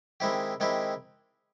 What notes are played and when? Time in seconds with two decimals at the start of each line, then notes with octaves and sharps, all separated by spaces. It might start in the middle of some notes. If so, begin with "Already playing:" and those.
0.20 D#3 G#3 C4 E4 G4
0.60 D#3 G#3 C4 E4 G4